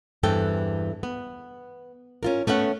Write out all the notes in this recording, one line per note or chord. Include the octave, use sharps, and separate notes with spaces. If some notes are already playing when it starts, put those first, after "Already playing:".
E2 G2 E3 C4 A4 G5
B3
C#4 F4 A#4
A3 B3 C#4 F#5